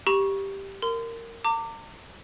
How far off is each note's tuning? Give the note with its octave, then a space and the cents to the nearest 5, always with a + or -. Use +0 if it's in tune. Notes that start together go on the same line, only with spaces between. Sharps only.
G4 +0 A#5 +45 C#6 +0
A#4 -15 C6 -35
A#5 -45 D6 +0